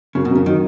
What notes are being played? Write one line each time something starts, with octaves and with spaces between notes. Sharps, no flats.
F#2 C#3
B2
F#2 C#3
D#3 F#3